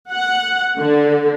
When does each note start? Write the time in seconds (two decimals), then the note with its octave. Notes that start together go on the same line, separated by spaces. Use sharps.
0.11 F#5
0.78 D3